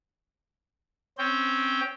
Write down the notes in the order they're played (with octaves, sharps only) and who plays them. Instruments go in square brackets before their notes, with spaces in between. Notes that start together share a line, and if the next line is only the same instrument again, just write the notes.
[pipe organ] C4 C#4 G5